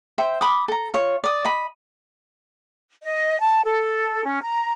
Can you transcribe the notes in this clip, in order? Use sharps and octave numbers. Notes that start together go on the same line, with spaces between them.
C5 E5 G5
B5 D6 D#6
A4 A#5
F4 C#5
D5 D#6
D#5 B5
D#5
A5
A4
C#4
A#5